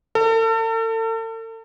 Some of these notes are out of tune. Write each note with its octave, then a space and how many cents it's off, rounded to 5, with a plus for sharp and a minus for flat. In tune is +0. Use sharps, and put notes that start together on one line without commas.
A4 +40